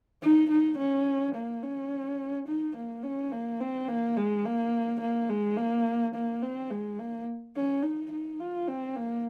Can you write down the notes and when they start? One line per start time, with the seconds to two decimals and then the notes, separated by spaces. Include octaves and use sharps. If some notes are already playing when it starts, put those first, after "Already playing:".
0.22 D#4
0.50 D#4
0.78 C#4
1.35 A#3
1.63 C#4
2.48 D#4
2.77 A#3
3.04 C#4
3.32 A#3
3.61 C4
3.88 A#3
4.17 G#3
4.45 A#3
5.01 A#3
5.29 G#3
5.57 A#3
6.15 A#3
6.42 C4
6.71 G#3
6.99 A#3
7.56 C#4
7.83 D#4
8.12 D#4
8.40 F4
8.68 C4
8.96 A#3